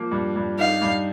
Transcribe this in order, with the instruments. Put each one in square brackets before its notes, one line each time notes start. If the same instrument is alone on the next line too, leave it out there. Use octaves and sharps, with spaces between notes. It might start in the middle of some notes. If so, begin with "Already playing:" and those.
Already playing: [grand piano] F3 A#3
G2
G2
[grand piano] D#4 [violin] F5
[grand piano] G2